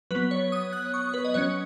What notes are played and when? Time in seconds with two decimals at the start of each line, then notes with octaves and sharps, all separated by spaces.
0.11 F#3 B4
0.15 B3
0.31 C#5
0.52 D#6
0.73 F#6
0.94 C#6
1.14 B4
1.25 D#5
1.34 F#3 C#4 C#5